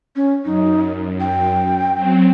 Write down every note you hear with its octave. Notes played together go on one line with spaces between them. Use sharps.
C#4
F#2 D#4
G5
F#3 C4